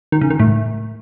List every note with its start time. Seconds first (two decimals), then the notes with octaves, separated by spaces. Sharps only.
0.12 D#3
0.21 C#3
0.30 D#3
0.39 A2